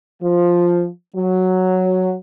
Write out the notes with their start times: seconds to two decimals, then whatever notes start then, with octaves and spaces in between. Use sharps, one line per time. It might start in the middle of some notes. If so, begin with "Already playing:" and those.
0.22 F3
1.15 F#3